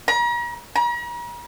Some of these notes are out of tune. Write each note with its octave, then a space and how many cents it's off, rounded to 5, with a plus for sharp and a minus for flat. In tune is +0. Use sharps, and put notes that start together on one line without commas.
A#5 +40
A#5 +45